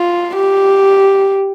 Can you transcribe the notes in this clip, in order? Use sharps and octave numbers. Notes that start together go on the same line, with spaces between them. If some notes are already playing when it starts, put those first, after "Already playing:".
Already playing: F4
G4